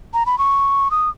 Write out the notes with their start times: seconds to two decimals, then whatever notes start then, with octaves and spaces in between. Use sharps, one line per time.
0.14 A#5
0.26 B5
0.38 C#6
0.91 D#6